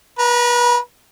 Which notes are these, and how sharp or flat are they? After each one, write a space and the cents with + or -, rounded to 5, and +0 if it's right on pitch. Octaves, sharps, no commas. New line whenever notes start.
B4 -30 A#5 +0